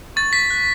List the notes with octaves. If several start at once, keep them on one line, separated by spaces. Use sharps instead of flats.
C#6 A6
B6
F#6